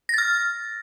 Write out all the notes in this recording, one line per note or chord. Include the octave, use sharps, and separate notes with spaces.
F6 A6 A#6